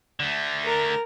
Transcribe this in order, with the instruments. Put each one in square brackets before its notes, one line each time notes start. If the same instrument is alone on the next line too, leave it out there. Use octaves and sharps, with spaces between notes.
[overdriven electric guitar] D3 A3
[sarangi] A#4